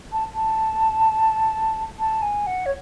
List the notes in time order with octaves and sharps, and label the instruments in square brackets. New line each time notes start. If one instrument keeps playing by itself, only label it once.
[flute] A5
A5
A5
G#5
F#5
C#5